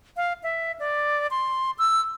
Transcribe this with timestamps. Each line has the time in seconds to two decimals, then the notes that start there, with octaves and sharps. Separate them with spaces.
0.17 F5
0.43 E5
0.80 D5
1.31 C6
1.78 E6